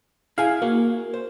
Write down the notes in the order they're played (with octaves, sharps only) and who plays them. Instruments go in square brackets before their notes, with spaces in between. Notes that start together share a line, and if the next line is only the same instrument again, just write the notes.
[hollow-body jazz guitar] E4 G#4 G#5 [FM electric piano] F5
[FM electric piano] A#3 [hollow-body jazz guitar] F#4
[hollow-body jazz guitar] C5